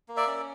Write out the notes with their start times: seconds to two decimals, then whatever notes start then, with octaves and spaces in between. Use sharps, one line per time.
0.08 A#3
0.17 D5 E5
0.27 C#4